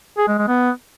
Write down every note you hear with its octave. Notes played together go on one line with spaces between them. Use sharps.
G#4
G#3
G#3
B3